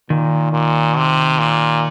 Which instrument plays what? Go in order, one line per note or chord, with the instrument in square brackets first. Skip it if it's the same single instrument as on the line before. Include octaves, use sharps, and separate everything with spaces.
[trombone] A#2 [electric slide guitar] D#3
[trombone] A#2
C3
A#2